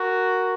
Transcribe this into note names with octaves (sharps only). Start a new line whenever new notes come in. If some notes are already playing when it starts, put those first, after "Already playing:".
Already playing: F#4 A#4